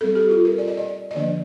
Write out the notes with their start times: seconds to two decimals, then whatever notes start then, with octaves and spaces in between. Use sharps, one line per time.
0.01 G3 C4 A4
0.15 G4
0.30 F4
0.45 A#4
0.58 D5
0.68 D#5
0.77 D5
1.11 D#5
1.15 D3 F3 A#3 D4 D5